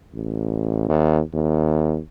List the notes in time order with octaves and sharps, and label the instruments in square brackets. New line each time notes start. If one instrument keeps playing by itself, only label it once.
[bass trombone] A1
D#2
D#2